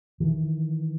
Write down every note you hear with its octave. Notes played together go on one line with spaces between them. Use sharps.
D#3 E3